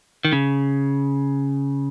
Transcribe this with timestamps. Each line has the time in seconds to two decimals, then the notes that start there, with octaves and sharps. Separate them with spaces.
0.25 D#3
0.32 C#3